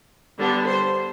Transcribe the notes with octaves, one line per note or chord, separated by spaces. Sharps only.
D3 G3 B3 D4
C5